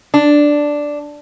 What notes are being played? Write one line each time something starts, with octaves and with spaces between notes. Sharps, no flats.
D4